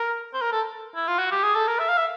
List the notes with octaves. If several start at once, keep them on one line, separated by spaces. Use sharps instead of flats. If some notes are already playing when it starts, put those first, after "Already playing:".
Already playing: A#4
C5
A#4
A4
E4
F4
F#4
G4
G#4
A4
A#4
E5
F5
E5